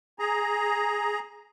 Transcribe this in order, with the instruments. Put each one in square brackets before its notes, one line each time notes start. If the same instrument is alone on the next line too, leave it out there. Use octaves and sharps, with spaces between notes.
[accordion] G#4 A#5